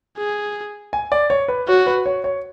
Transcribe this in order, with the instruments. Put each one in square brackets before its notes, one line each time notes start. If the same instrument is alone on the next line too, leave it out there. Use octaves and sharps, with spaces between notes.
[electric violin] G#4
[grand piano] G#5
D5
C#5
B4
[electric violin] F#4 [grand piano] C#5
[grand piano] B4
C#5
C#5